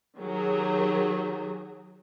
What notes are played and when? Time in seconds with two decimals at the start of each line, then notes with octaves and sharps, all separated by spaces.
0.18 D#3 F#3 G4 G#4